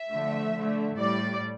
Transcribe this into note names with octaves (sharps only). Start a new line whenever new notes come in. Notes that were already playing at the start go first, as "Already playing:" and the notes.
Already playing: E5
D3 F3 A3
D3 A3
A2 G3 D5